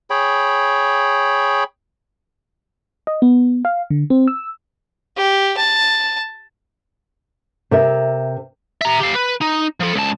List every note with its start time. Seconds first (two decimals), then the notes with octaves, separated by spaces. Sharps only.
0.10 G#4 C#5 G5 B5
3.07 D#5
3.22 B3
3.65 F5
3.90 D3
4.10 C4
4.28 E6
5.17 G4
5.57 A5
7.71 C3 A#4 E5
8.82 E5 A#5
9.00 G4 F5
9.15 B4
9.41 D#4
9.80 F3 A4
9.95 C#2 A5